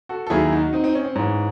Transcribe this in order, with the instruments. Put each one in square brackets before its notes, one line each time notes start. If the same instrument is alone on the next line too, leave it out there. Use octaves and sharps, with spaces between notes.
[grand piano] F#4 A4
A4
D#2 D#3 F#3 E4 G#4
D#4 F#4
C4 D#4
C4 D#4
C#4
C4
G#2 E3 C#4